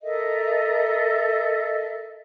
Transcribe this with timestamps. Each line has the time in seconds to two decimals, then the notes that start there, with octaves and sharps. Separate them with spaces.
0.03 A4 A#4 D#5 E5